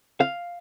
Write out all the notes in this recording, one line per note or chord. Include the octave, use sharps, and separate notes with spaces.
F5